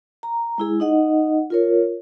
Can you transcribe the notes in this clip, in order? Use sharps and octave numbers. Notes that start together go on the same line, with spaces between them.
A#5
G#3 E4 G#4
D#4 D#5 F#5
F4 A#4 C#5